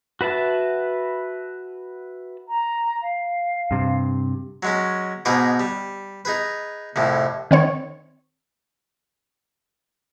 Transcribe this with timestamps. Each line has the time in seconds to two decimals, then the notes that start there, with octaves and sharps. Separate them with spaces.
0.21 F#4 B4 E5 A5
2.48 A#5
3.02 F5
3.71 G2 C3
4.63 F#3 G#3 C#4
5.25 G#2 B2 D#4 G#4 B4 D6
5.60 G3
6.25 D#4 G#4 B4
6.96 C2 F2 A2
7.51 D#3 C4 C#5